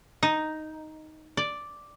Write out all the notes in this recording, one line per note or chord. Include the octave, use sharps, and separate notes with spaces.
D#4
D5